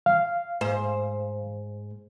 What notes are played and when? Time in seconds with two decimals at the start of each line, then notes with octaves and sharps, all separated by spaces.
0.06 F5
0.61 G#2 C5